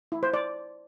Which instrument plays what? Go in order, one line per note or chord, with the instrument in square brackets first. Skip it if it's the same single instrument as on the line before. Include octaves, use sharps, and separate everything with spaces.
[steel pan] E4
C5
D5